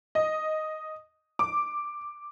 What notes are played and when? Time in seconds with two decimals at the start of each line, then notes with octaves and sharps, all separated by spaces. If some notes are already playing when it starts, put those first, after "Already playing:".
0.15 D#5
1.39 D6